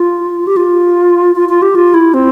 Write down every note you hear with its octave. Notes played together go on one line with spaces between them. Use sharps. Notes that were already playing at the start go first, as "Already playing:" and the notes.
Already playing: F4
G4
F4
F4
F4
G4
F4
E4
C4